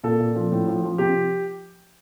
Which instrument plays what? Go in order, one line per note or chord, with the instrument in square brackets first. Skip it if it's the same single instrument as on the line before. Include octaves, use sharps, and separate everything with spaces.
[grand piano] A#2 A4
A#2
F3
A2
F3
F3
C3 G4